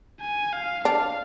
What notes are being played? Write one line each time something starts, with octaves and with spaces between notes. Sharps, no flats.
G#5
F5
D4 F5